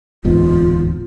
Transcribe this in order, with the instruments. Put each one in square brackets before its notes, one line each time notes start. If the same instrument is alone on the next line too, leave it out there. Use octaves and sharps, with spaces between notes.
[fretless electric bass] D1 E2 G#2 [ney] F4